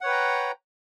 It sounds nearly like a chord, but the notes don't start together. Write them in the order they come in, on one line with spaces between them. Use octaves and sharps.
F#5 C#5 B4 G5 A#5